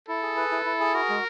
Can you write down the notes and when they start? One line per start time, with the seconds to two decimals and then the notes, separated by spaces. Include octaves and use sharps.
0.08 E4 A4
0.23 G#4
0.37 B4
0.51 E4
0.65 E4
0.80 G#4
0.94 F#4 A#4
1.09 G#3